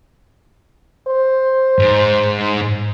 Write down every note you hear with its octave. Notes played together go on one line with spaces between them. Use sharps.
C5
G#2